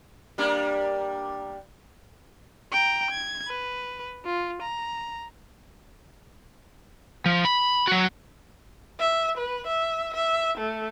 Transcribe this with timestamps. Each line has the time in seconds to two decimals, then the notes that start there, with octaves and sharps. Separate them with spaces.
0.38 G3 A#3 D4
2.72 G5 A#5
3.11 G#6
3.48 B4
4.25 F4
4.62 A#5
7.26 F3
7.45 B5
7.88 F#3 F#4
9.00 E5
9.37 B4
9.67 E5
10.14 E5
10.58 A3